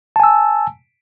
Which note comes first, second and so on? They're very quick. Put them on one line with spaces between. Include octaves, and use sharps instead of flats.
A5 G#5 E6